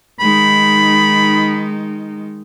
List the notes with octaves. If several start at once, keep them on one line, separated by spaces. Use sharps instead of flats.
D#3 G#3 D#4 B5